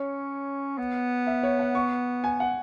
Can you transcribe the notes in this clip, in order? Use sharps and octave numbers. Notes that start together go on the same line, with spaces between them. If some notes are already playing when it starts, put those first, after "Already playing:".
Already playing: C#4 C#5
B3
E5
C#5
F#5
C#6
G#5
F#5